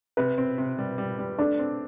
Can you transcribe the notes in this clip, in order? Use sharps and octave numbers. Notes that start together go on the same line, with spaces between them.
C3 B4
C4
C3
G3
G3
G3
A3 D4
C4